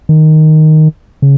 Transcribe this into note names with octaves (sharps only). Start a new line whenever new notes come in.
D#3
C#3